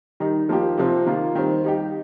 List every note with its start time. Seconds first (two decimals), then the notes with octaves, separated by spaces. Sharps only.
0.20 D#3 G3 D#4
0.49 F3 A#3 G4
0.77 C3 F3 C4
1.06 D#3 A#3 F4
1.35 D#3 G3 C4
1.64 G3 D#4 G4